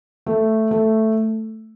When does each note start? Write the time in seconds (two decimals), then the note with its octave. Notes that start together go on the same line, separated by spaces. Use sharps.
0.26 A3
0.71 A3